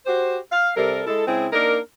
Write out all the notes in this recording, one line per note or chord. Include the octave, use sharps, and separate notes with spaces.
F#4 G4 C5
F5
C3 G3 A4 A#4
G#3 E4 A4
C#3 G#3 C4 E4 G#4
A#3 D4 D#4 A#4